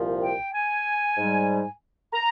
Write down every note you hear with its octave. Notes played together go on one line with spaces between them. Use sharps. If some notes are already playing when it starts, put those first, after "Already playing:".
Already playing: C2 A#2 F3
G5
G#5
G#2 G3
A#5